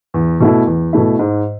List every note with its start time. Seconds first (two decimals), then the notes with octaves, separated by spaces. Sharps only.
0.14 E2
0.40 B2 A3 E4
0.67 E2
0.93 B2 A3 E4
1.19 G#2